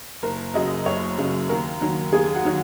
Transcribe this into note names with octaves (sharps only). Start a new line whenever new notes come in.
F#1 A#4
F#2 C#3 F#3 D#5
F#1 C#5
F#2 C#3 F#3
D#2 A#4
D#3 F#3
D#2 G#4
F#4
D#3 F#3